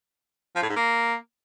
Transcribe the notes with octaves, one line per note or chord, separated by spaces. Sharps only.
F3
A2
G#2
A#3